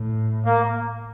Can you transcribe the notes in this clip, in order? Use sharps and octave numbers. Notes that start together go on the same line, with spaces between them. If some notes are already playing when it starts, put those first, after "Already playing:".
Already playing: A2
A#3